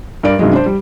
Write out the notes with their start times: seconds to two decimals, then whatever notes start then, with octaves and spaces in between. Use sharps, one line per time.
0.23 G2 A#4 D5 D7
0.39 G2 C3 D#3 F#3 G#3
0.53 D4 C5
0.66 G3